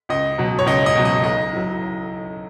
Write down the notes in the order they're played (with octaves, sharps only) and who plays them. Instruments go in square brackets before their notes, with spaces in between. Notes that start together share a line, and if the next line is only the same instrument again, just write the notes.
[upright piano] C#2 D#5
B2 F#3
C#5
C#2 D#5
D#5
B2 F#3
D#5
B1 D#5
A2 F#3